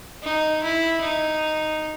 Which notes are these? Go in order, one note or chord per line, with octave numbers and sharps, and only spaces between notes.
D#4
E4
D#4